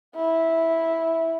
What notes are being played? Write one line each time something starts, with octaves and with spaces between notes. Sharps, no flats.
E4